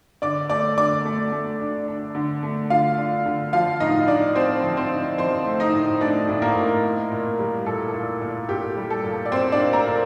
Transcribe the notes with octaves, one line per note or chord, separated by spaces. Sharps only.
D3 D5 D6
A3 D5 D6
D3 D5 D6
A3
A3
D4
D4
D3
A3
D3 F4 F5
D4
D3
F3 F4 F5
A2 D#4 D#5
D4 D5
C4 D4 C5
F3
C4 C5
D4
F3 C4 C5
A3
D#4 D#5
A2
A3 D4 D5
A2
A#3 A#4
A2
A#3
A#2
G3
A#2 A4
A#2
A#2
A#2 G4
G3
A4
A#2
D5
A#2 C4 C5
D4 D5
A#3
A#4 A#5
A#2